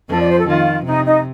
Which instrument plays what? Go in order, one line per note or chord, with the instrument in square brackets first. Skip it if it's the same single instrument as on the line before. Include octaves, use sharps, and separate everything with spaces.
[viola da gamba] F2 F3 [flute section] A4
[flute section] D5
C5
A4
[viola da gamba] D#3 [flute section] F4
[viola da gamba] C3 [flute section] D#4
[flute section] D#4